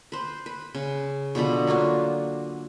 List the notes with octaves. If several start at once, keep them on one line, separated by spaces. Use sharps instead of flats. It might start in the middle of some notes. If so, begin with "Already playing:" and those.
B4 C5
B4
C#3
B2 D3 F3 B5
F#3 A#3 F4 F#4